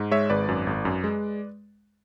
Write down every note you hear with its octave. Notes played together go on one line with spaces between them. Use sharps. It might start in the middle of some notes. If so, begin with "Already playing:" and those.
Already playing: G#2
G#3 C#5 E5
G#1 B4 D5
F#2
G#1
F#2
G#3